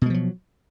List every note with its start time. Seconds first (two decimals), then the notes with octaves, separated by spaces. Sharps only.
0.02 B2
0.06 G#3
0.10 F3
0.14 F#3